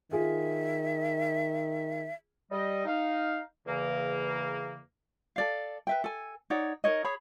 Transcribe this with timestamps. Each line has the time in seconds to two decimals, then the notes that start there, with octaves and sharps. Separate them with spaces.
0.12 D#3 F4 G#4 E5
2.51 G3 D#5
2.86 D#4 F5
3.66 E2 C#3 E3 A#3
5.36 A4 D5 F5
5.87 B4 E5 G5
6.04 A4 G#5
6.50 D#4 C#5 D5 F#5
6.84 D#4 A#4 C#5 D#5
7.04 G#4 C#5 B5